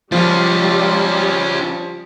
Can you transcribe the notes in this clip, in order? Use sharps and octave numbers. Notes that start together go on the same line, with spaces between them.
F3 G3 C#4 F4